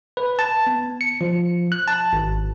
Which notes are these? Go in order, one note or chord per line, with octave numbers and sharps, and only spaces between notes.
B4
A5
B3
C#7
F3
F#6
A5
G#1